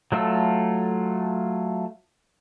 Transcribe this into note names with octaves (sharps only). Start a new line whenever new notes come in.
F#3 A3 F4 A4 E6